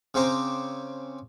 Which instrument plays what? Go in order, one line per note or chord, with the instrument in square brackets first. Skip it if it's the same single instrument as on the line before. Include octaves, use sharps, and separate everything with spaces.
[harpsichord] C#3 C4 C5 A#5 D6